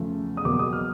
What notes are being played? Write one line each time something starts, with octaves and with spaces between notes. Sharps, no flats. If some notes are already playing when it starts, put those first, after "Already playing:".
Already playing: E2 C#3 F3 A3
D#6
E2 B2 F#3 A#3 D6
D#6
F6